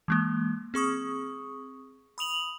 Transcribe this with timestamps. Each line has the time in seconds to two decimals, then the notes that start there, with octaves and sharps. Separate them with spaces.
0.08 E3 G#3 A#3
0.74 C4 G#4 C#6 D#6
2.18 B5 D#6 F7 F#7